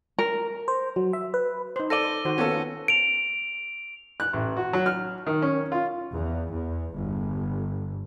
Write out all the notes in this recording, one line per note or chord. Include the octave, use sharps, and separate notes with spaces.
A#4
C5
F#3
E5
B4
D#4 C5
A4 D5 A#6 D#7 G7
D#3 F#4 C5
A#3 B3 C#4 F4 A4
D7 F7
F#6
A1
F#4
F#3
F6
D#3
C#4
F4
E2
E2
G1